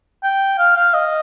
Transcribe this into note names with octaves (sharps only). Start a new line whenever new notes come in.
G5
F5
F5
D#5